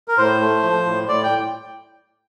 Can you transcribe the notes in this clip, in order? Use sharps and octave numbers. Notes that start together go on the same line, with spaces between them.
A#4
A2 C5
A3
F3
A2
A2 D5
G5